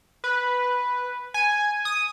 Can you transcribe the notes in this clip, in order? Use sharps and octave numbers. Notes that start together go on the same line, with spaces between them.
B4
G#5
D#6